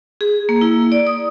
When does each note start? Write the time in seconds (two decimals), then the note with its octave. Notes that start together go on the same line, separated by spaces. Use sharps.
0.21 G#4
0.49 A#3
0.61 E4
0.92 D5
1.07 D#6